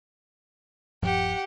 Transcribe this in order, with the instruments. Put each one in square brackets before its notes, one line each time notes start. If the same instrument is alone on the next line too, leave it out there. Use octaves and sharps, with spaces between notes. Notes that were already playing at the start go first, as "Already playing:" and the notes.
[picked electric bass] D#1 G2 F3 [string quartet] G4 F#5